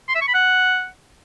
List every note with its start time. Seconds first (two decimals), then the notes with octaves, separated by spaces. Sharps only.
0.09 C6
0.15 E5
0.21 C#6
0.28 B5
0.34 F#5